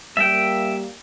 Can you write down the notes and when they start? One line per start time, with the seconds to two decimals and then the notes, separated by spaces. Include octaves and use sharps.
0.17 G3 A#3 E5 G5